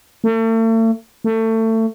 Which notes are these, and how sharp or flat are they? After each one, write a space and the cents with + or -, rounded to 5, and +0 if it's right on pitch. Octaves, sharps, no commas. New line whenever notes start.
A3 +40
A3 +25